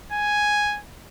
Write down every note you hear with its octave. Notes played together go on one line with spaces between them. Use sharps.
G#5